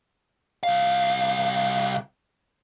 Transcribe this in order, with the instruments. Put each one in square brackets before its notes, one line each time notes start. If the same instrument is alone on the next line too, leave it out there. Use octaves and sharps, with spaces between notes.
[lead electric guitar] C2 F5